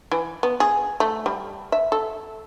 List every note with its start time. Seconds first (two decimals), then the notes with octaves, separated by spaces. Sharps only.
0.11 E3
0.43 B3
0.60 G#4
1.00 A3
1.26 G3
1.72 E5
1.92 A4